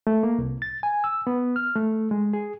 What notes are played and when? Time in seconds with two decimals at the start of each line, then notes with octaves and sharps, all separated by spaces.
0.07 A3
0.23 A#3
0.38 C2
0.62 A6
0.83 G#5
1.04 E6
1.27 B3
1.56 F6
1.76 A3
2.11 G#3
2.33 G#4